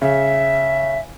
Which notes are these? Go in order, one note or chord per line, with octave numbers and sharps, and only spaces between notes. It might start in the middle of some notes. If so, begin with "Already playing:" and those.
C#3 E5